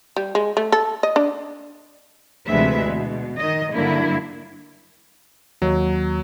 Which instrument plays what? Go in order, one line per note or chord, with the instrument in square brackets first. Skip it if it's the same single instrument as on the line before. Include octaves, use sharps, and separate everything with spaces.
[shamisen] G3
G#3
A3
A4
D#5
D4
[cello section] D2 C3 E3 G#3 B4 E5
B2
D#3 D#5
G2 D3 F#3 A#3 E4
[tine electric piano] D#2 [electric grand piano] F#3